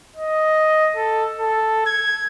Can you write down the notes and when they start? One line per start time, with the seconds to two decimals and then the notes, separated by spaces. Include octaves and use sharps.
0.16 D#5
0.96 A4
1.39 A4
1.86 G#6